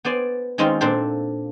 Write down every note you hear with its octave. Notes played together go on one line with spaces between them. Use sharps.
B3 C5 D5 G#5
D#3 G#3 C4 C#4 D#4 F4
A#2 C4 D4 A4 C5